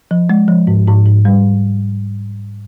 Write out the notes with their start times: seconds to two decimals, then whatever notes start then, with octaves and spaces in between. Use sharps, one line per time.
0.11 F3
0.30 G#3
0.48 F3
0.67 G#2
0.88 G#2
1.06 G#2
1.25 G3